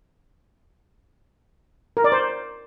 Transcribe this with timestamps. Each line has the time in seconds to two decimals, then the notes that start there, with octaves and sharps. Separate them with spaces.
1.97 A#4
2.04 D5
2.12 C5